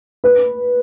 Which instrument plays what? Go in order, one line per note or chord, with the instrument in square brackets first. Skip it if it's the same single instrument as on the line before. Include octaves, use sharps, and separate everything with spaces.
[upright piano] B4